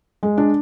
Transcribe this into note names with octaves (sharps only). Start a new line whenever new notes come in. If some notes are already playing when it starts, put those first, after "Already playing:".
G#3
D4